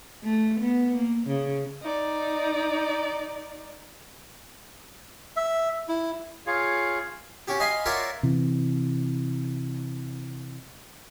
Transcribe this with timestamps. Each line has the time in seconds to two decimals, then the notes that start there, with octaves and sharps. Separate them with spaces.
0.24 A3
0.60 B3
0.96 A#3
1.27 C#3
1.81 D#4 D5
5.36 E5
5.89 E4
6.47 F4 G#4 C#5 F5
7.48 C#4 F#4 G4
7.60 D#5 F5 G#5 B5 C6
7.85 F4 F#4 A#4 C#5 D5 E5
8.23 C3 E3